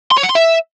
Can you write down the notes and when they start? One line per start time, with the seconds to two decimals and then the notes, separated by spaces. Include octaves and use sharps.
0.12 C6
0.17 C#5
0.23 F#5
0.29 C6
0.35 E5